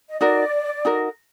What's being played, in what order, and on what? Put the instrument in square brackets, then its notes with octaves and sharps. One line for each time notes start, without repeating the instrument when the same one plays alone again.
[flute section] D#5
[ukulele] D#4 F#4 A#4 [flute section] D5
[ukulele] D#4 F#4 A#4